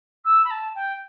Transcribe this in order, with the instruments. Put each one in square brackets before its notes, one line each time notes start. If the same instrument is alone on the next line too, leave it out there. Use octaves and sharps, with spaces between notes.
[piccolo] E6
B5
A5
G5